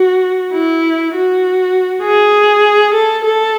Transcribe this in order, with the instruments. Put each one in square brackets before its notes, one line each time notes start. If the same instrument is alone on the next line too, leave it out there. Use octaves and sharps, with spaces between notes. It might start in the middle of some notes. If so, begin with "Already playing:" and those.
Already playing: [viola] F#4
E4
F#4
G#4
A4
A4